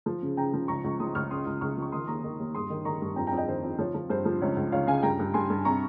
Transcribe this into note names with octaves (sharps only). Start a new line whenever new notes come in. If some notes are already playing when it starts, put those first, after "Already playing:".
F3
C#3
C#3 G5 A#5
F3
C#2 A#5 C#6
C#2
F3 C6 D#6
C#2 C#6 F6
C#3 C6 D#6
C#2
C#2 C#6 F6
F3
C#6
D#3 C6 D#6
D#2 A#5 C#6
D#3
D#2
G2 C6 D#6
D#3
D#3 A#5 C#6
G2
F2 G5 A#5
G5 A#5
F2
D#5 G5
D#3 C5
F2
F3 C#5
F3
G2 C5
F3
C#2 C#5
C#2
C#2 C#5 F5
C#3 F5 G#5
G2 G5 A#5
G2
G2 G#5 C6
G2
C3 A#5 C#6